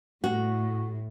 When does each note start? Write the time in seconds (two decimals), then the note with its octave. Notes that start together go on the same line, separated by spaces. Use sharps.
0.24 A2 F#4